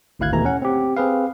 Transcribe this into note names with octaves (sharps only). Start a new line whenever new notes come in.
G#1 D2 E4 F5 F#6 G#6
D#2 B2 E3 A3 A#5
C#4 F#5
C4 G4
C4 G#4 B4 F5